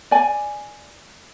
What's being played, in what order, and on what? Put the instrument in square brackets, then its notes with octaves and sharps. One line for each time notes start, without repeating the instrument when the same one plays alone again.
[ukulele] D5 G#5